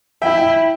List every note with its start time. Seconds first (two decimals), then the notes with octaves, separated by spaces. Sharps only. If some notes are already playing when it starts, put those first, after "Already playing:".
0.22 E4 E5 G5
0.37 E5 G5